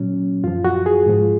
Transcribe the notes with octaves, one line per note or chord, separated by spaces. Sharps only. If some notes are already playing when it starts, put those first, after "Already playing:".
Already playing: A#2 F#3 C#4
F#2 F3 F4
F#4
G#4
G#2 F3